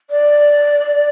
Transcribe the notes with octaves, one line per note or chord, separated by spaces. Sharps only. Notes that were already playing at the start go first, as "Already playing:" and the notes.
D5